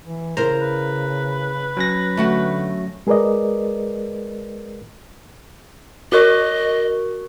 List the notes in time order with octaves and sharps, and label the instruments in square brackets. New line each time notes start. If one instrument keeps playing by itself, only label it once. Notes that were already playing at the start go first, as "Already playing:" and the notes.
[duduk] E3
[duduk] C#3 [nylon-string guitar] E4 A#4 C5 [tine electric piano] A#5
[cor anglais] B4
[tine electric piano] F#3 C#4 A#6
[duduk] D3 [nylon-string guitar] A3 F#4 F#5
[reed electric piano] G#3 G#4 A#4 B4 D5 D#5
[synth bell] F#4 A#4 C#6 [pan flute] D#5